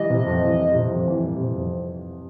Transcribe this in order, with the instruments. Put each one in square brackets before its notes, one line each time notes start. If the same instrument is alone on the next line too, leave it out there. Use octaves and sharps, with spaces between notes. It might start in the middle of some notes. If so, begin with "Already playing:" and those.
Already playing: [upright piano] E3 G3 [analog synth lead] D#5
[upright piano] C3
F2
E3
G3
C3
F2
E3
G3
C3
F2